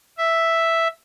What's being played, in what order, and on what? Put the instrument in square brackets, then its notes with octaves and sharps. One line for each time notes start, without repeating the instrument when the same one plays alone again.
[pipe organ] E5